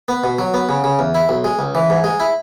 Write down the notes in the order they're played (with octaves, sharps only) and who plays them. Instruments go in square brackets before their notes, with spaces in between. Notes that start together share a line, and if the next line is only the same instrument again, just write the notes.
[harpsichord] B3
B2
F#3
B3
C#3
C#3
E2
E4
B1
G#3
C#2
E3
G#2
G#3
E4